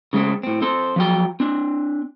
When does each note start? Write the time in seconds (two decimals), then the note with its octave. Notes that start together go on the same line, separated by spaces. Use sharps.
0.13 C#3 G#3 A3 C4
0.43 A2 C4
0.62 C4 A4 C5
0.96 F3 F#3 G5
1.40 C4 D4